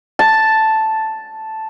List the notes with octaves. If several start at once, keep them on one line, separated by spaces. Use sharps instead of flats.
A5